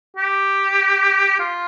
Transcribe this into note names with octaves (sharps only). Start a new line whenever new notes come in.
G4
F4